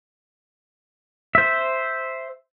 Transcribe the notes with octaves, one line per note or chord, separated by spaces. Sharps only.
C5 E5